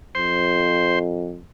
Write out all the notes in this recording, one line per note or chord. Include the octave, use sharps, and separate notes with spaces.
F2 C5 C6